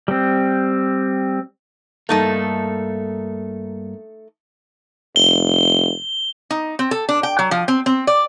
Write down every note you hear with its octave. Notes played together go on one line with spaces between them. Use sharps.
G3 C4
G2 A3 A#3 D#4 A4
F1 G7
D#4
C4
A4
D4
G5
F#3
F3
C4
C4
D5